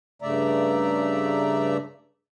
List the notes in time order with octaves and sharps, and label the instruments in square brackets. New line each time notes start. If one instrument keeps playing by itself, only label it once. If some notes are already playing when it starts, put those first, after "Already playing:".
[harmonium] G2 C#3 A3 D5 E5 A#5